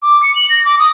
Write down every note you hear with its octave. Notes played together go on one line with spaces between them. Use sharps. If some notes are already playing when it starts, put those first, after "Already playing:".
D6
C#7
F#7
A#6
D6
D#6